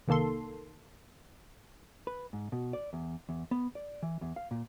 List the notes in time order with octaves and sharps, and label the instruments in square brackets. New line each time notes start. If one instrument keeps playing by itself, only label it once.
[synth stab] C2 D#3 A#3 A4 C6
[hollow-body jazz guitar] B4
G#2
B2
D5
E2
E2
B3
D5
E3
E2
F5
A#2